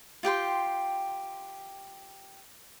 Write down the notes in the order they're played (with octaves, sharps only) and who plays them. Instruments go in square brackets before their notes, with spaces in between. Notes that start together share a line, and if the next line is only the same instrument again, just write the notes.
[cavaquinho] F4 G4 G5 C6